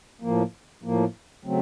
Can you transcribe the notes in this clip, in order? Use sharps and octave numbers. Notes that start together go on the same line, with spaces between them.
A2 F3 A#3
A2 F3 A#3
C#3 F#3 A3 C4